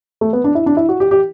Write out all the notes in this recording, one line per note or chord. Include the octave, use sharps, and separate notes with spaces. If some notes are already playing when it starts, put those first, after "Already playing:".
A3
B3
D4
E4
D4
E4
F#4
G4
G4